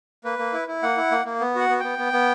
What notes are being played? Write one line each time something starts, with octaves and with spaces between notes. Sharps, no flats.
A#3 B4
A#3
E4
E4
A#3 F#5
E4
A#3
A#3
B3
F#4 F#5
B3
B3 G5
B3
B3